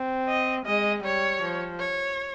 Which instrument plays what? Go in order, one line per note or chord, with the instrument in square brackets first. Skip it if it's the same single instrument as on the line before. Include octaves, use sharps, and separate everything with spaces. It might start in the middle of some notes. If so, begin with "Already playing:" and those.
Already playing: [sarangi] C4
[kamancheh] D#5
[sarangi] G#3 [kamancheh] D#5
[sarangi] G3 [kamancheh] C#5
[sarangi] F3
[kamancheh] C#5